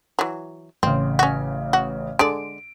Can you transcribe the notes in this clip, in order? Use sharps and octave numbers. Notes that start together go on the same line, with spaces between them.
E3 F#3
A1 C#3 C4
C#4 F#4
F#4
D3 G#3 D5 D7